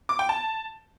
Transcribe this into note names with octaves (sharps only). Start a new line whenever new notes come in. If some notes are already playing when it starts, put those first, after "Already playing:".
D6
G5
A5